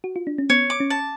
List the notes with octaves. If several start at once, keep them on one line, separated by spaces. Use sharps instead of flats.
F#4
F4
D4
C#4
B3 C#5
D6
C#4
A5